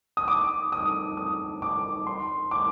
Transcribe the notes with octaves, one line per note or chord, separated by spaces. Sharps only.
D#6
D6
D#6
D#6
D6
C6
D6